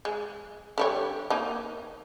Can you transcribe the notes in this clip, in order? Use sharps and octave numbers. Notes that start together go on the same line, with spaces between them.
G#3
D3 G3 C#5
A#3 D#4